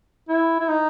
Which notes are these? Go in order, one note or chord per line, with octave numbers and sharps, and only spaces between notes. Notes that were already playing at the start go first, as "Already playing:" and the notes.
E4
E4
D#4